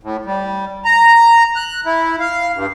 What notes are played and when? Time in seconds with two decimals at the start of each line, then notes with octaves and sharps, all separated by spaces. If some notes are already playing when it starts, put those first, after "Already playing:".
0.03 A2
0.25 G3
0.85 A#5
1.56 F#6
1.85 E4
2.20 F5
2.54 G2